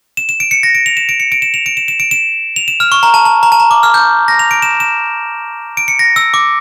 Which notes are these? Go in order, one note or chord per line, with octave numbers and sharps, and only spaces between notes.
E7
E7
D7
C#7
A#6
D7
F7
E7
D7
C#7
D7
E7
F7
D7
E7
E7
D7
E7
F7
E7
F6
C#6
A#5
A5
A5
A#5
A5
A#5
D6
F6
G6
A#6
F7
D7
E7
E7
D7
C#7
A#6
E6
D6